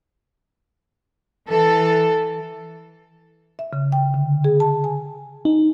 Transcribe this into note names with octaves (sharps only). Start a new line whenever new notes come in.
E3 A4
E5
C#3
G5
D3
G#4
A5
G#5
D#4